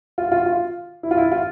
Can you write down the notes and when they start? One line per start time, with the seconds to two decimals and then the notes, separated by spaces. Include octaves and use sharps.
0.18 F4
0.32 F4
0.46 F4
1.03 E4
1.11 F4
1.17 E4
1.32 F4